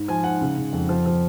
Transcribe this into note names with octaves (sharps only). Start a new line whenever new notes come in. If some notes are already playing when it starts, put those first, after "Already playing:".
Already playing: G#2
F3 G#5
G#2 F#5
C#3
C#3
F2
F3
F3